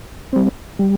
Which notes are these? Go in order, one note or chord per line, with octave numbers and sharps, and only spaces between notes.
G3 C4
G3